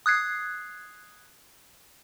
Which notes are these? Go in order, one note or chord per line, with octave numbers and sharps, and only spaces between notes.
D#6 F#6 G#6 C7